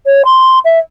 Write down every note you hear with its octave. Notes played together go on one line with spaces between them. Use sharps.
C#5
C6
E5